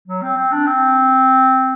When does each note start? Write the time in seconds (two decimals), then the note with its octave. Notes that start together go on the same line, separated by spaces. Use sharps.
0.08 F#3
0.22 C4
0.37 C4
0.52 D4
0.67 C4